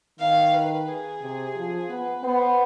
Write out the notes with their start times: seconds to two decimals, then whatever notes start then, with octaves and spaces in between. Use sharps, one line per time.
0.19 D#3 F5
0.54 B4
0.88 G#4
1.22 C3
1.56 F3
1.90 B3 B4
2.24 B3 C5